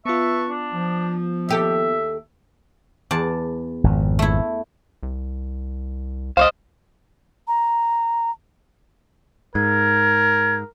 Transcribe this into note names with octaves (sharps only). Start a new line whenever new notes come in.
B3 F4 B4 E5 A5 C#6
D4
F3
D#2 G4 A4 E5
E2 D5 A5
G#1 F2
A3 E4
C2
C#2 C5 C#5 D#5 F5
A#5
G#2 A#4 G#6